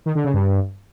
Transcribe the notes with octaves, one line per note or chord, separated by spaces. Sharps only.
D#3
D3
C#3
G2